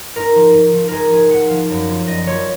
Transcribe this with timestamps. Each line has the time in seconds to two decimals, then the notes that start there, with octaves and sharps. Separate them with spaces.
0.16 G#2 A#4
0.35 F3
0.54 G#2
0.73 F3
0.88 G#2 G#4 A#4
1.11 F3 G#4
1.31 G#2 F#5
1.50 F3 F5
1.69 F#2
1.89 F3
2.07 F#2 D#5
2.26 F3 C#5